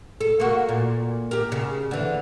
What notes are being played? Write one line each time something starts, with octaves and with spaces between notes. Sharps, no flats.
A4
A#3 F#4
A#2
G4 A#4
C#3
D3 E3